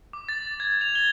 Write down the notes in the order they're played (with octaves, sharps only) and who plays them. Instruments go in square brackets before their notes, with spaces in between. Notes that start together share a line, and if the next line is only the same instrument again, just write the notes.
[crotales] D6
A6
G#6
F7
G7